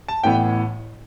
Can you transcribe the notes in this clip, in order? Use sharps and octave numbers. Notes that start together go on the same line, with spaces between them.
A5
A1 A2 E3 B3 G5